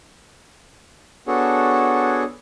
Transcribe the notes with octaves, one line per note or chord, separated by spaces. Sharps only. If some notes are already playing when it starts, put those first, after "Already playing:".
B3 D4 F#4 G#4 A4 C#5